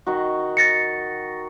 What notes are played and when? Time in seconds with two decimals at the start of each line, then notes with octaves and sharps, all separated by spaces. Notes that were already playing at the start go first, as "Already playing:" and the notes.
0.06 D#3 D#4 F#4
0.57 A6 A#6 C#7